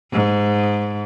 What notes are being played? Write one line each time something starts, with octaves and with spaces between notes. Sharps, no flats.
G#2